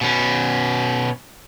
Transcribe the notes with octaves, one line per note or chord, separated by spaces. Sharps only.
B2 C#4